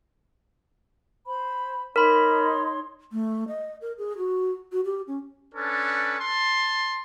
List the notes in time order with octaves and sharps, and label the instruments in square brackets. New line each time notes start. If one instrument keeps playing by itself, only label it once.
[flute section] C5 B5
[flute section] D#4 C#5 C6 [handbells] A#4 B5
[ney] A3
D#5
A#4
G#4
F#4
F#4
G4
C#4
[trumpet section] C#4 D4 A4 B4
A5 C6